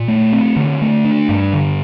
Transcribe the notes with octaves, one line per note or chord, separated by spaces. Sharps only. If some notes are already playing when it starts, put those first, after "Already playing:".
Already playing: A#2
A3
C4
D3
A3
D4
G2
D3